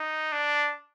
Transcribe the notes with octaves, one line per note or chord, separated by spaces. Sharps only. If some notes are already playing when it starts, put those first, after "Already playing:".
Already playing: D#4
D4